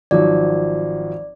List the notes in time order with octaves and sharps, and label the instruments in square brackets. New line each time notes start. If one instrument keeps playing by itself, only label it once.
[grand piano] G#1 F3 F#3 [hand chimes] D5